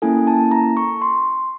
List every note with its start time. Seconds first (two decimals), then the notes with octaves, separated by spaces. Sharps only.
0.02 A#3 C#4 E4 A4 G#5
0.27 A5
0.51 A#5
0.77 C#6
1.02 C6